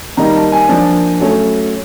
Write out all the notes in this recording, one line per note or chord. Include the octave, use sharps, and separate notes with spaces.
D#3 G3 A#3 D#4 A#5
A5
G#5
F3 A#3 D4
F#3 A3 C#4